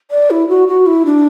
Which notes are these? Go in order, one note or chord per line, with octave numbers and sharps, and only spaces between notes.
D5
E4
F#4
F#4
E4
D4